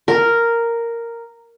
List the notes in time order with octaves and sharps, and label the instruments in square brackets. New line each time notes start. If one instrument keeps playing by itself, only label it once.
[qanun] A#4